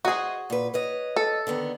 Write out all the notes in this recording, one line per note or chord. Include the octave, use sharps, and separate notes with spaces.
F#4 G#4 C5 D#5
A#2 B4
B4 C#5 D#5
A4
D3 D#3 B3